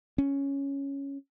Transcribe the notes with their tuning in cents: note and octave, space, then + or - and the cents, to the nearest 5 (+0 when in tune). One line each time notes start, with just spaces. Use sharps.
C#4 +0